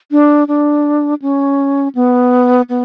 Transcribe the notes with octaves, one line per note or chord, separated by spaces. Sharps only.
D4
D4
C#4
B3
B3